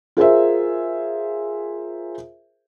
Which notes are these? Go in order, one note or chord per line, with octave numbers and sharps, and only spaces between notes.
F4 G#4 A#4 C5 E5